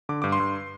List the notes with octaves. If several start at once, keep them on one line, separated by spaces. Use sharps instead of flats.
D3 D6
G2 D6
C6
G2